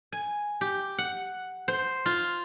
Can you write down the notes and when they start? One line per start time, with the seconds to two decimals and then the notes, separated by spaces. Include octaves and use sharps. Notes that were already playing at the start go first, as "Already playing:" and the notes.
0.12 G#5
0.61 G4
0.98 F#5
1.68 C5
2.06 F4